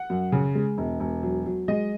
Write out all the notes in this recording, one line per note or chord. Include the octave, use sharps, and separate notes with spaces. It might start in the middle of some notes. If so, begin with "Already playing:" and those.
Already playing: F#5
F#2
C#3
G#3
E1
E1
F#3
F#3
G#3 D#5